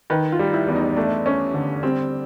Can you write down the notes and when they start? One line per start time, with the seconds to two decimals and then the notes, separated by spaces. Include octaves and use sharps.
0.10 D#3 B4
0.32 F4
0.39 G3
0.53 E4
0.68 E2
0.75 D#4
0.97 A3 D4
1.26 C#4
1.54 D3
1.83 G3 C4